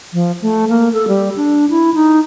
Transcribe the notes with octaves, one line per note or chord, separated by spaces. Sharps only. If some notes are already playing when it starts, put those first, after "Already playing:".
F3
A3
A#3
A4
G3
D4
E4
D#4